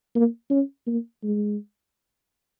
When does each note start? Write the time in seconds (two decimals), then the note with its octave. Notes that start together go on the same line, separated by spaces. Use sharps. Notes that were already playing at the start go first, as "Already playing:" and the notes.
0.16 A#3
0.50 C#4
0.87 A#3
1.24 G#3